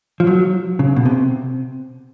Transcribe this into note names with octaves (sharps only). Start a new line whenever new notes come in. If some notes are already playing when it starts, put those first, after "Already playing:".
F3
F#3
C#3
B2
C3